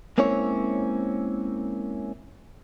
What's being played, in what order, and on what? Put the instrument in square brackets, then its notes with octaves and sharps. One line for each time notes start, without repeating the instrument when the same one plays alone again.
[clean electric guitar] G#3 A#3 C4 C#4 E4 C#5